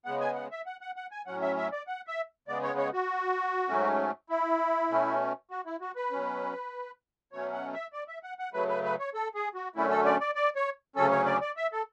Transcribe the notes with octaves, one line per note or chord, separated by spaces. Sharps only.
C#3 G#3 B3 F#5
G#5
F#5
E5
F#5
F#5
F#5
G#5
A2 F#3 C#4 F#5
E5
E5
D5
F#5
E5
C#3 G#3 B3 D5
C#5
C#5
F#4
G#2 F#3 A3 C#4
E4
B2 A3 C#4
F#4
E4
F#4
B4
B2 F#3 C#4
B2 F#3 A3 C#4 C#5
F#5
E5
D5
E5
F#5
F#5
C#3 F#3 A3 B4
B4
B4
C#5
A4
G#4
F#4
F#2 D3 A3 C#4 E4
A4
D5
D5
D5
C#5
D2 C#3 F#3 C#4 A4
C#5
D5
D5
E5
A4